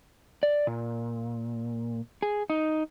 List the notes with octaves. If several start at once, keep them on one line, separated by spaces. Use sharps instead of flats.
D5
A#2
G#4
D#4